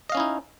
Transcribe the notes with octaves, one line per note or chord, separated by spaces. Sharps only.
C#4 D#4 E4 D#5 F5